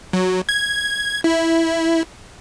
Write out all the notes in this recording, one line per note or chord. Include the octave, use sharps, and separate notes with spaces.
F#3
G#6
E4